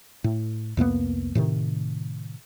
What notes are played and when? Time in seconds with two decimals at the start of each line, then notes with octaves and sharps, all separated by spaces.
0.24 A2
0.77 C2 F2 A#3 B3
1.35 A2 C3 D#3